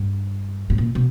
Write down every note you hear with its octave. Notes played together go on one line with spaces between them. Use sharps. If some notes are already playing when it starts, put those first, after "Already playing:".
Already playing: G2
A2
A#2
B2